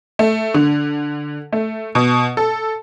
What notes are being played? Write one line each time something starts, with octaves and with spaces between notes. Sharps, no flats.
A3
D3
A3
B2
A4